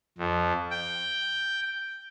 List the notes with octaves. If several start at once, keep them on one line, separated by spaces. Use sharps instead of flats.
F2
G5